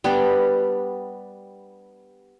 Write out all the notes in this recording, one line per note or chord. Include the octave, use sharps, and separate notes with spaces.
G3 B3 D4 G4